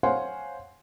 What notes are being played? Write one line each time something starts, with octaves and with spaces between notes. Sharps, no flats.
C5 C#5 F5 F#5 G#5 C6